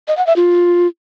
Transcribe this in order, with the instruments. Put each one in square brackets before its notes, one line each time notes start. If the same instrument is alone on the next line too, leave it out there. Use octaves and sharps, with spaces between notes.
[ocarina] D#5
F#5
E5
F4